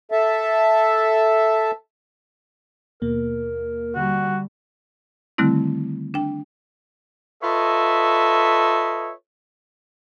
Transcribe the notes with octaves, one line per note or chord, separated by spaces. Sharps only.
A4 E5 A5
D#2 B2 A#3 A#4
D3 G3 F#4
D3 D#3 G3 A3 C4 E4
D4 G5
F4 A4 B4 C#5 D#5 E5